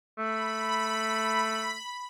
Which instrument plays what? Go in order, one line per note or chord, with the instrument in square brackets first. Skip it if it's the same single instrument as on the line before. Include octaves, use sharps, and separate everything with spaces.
[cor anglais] A3 [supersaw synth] B5